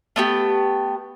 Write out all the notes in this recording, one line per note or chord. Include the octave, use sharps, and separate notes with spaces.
A3 B3 G4